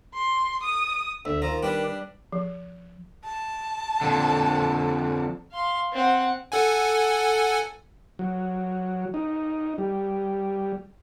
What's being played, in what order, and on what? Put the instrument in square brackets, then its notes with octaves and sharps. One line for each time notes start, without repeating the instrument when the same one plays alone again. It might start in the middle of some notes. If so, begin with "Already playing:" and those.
[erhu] C6
D#6
[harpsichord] D2 [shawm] E5
[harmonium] D#3 [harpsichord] F3 [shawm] A#5
[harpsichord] G3 B4 [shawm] D4
[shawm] D4
[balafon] F3
[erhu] A5
[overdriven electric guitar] F2 D3
[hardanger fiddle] F5 C6
C4 F#5
[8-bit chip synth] A4 F#5 G#5
[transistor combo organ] F#3
D#4
G3